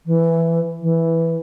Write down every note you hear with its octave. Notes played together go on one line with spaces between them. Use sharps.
E3
E3